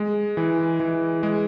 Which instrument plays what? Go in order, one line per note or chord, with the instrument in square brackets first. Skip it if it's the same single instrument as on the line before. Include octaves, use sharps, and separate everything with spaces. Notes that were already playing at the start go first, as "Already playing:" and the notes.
Already playing: [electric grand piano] G#3
E3
E3
G#3